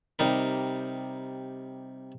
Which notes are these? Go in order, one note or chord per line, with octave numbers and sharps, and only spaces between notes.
C3 G3 D#4 A#4